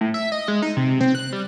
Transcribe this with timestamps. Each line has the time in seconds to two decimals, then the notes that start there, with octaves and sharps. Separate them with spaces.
0.01 A2
0.14 E5
0.32 D#5
0.48 G#3
0.62 D#4
0.77 C3
1.01 C4
1.15 F#6
1.33 G3